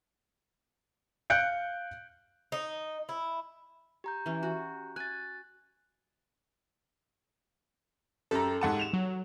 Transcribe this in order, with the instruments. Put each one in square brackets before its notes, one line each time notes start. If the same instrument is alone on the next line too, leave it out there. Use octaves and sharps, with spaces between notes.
[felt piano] F5 F#6 G6 C#7 D7
[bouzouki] D#4
E4
[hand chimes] G4 A#5 G6
[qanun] E3 C#4
F#4
[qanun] G#5 [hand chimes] F#6 A6
[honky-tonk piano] F#2 A#5 [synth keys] G4 A4
[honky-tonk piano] G#2 F#5 A5
E7 F7
[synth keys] F#3